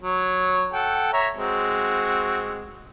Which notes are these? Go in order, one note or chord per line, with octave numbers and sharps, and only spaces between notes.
F#3 C#5
A4 F#5 G5
C#5 E5 A#5
G#3 C4 F#4